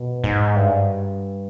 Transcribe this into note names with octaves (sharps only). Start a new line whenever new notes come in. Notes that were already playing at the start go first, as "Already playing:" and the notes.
Already playing: B2
G#2
G2